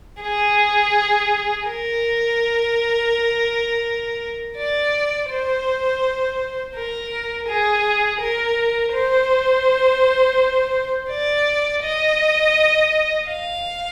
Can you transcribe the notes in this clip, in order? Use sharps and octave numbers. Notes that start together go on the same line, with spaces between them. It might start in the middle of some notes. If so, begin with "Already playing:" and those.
G#4
A#4
D5
C5
A#4
G#4
A#4
C5
D5
D#5
F5